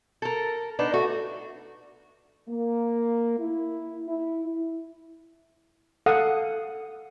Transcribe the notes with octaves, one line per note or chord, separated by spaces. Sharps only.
A4 A#4
B3 D4 D#4
A3 F#4
A#3
E4
E4
A4 F5 F#5 D#6